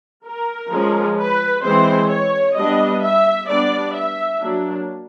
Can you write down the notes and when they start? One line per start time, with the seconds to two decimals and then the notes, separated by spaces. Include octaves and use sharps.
0.26 A#4
0.72 F3 G#3 C#4
1.17 B4
1.64 E3 G#3 C4 C5
2.10 C#5
2.56 G3 B3 D4 D#5
3.02 E5
3.48 G3 B3 D4 D5
3.94 E5
4.40 F#3 A#3 D4